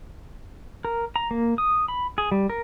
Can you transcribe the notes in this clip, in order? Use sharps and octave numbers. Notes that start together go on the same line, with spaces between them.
A#4
A#5
A#3
D#6
B5
G#4
G3
A#4